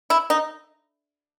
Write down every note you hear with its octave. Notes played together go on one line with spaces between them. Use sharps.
E4
D#4